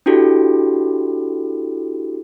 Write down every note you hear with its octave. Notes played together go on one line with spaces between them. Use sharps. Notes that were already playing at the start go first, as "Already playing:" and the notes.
D4 E4 F#4 G4 A4